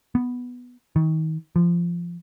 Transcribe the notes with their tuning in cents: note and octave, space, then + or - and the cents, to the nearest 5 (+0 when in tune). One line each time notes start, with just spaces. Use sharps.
B3 +0
D#3 +30
F3 -20